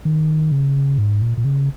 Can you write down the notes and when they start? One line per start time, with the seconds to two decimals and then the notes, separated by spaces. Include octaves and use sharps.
0.05 D#3
0.52 C#3
0.98 G#2
1.22 A#2
1.38 A#2
1.45 C#3